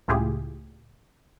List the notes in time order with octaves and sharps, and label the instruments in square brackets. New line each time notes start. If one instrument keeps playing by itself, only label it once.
[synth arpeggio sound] C#2 A2 E4 F4 G4 G#4